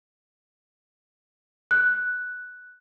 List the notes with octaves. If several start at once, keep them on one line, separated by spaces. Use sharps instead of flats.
F#6